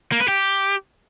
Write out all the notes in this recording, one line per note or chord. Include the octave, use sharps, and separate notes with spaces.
A#3
B4
G4